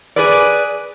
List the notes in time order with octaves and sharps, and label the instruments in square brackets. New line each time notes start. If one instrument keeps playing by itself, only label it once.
[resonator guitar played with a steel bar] G#4 B4 D5